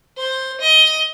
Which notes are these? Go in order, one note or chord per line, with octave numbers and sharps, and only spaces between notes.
C5
D#5